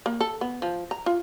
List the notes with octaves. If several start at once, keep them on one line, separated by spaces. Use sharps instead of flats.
A#3
A4
B3
F3
A#5
F4